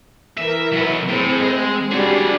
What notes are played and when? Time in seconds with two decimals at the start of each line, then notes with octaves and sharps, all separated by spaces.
0.38 E3 A#4 E5
0.73 F#3 B3
1.09 A2 C4 G#4
1.42 G#3
1.91 G3 D4 F#4 G#4